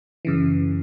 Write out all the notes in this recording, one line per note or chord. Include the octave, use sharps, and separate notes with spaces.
F#2 C#3 E3